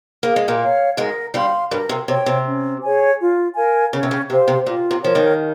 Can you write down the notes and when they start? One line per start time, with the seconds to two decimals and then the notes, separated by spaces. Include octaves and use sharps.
0.23 A#3 G#4
0.36 G#3
0.48 A#2 A#3
0.60 C#5 F5
0.97 G#2 G#3 A#4
1.34 G2 G3 F5 C6
1.71 G2 G3 A#4
1.89 C3
2.08 C3 C#5
2.11 G5
2.26 C3
2.46 C#4
2.82 G#4 C#5 G#5
3.19 F4
3.55 A#4 F5 G#5
3.92 C#3 C#4
4.03 C3
4.11 C#3
4.29 C3 G4 C5 F5
4.48 C3
4.66 A#2 F4
4.91 C3
5.03 F3 A#4 C#5
5.15 D#2 D#3